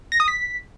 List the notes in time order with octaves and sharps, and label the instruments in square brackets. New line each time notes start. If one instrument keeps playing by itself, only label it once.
[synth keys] A#6
D#6
B6